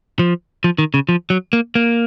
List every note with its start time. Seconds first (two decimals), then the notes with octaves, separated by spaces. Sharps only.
0.19 F3
0.64 F3
0.78 D#3
0.94 C#3
1.09 F3
1.30 F#3
1.53 A#3
1.75 A#3